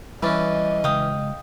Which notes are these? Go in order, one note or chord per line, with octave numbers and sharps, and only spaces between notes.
E3 G3 C#4 B4 D5 D#5
C#3 G#3 F5 G5 D#6